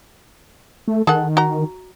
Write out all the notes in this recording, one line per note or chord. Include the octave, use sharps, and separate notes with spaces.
A3
D#3 G#4 A4 F#5
F#4 A#5